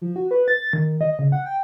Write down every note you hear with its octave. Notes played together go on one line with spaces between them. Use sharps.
F3
F#4
B4
A6
D#3
D#5
C#3
F#5
G5